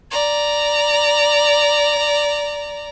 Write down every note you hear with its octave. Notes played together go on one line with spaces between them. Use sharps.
D5 A#5